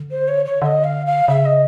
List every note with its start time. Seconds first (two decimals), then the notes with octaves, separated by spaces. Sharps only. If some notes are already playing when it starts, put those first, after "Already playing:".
Already playing: D3
0.11 C5
0.28 C#5
0.44 C#5
0.61 D3 D#5 E5
0.83 F5
1.06 F5
1.28 C#3 E5
1.45 D#5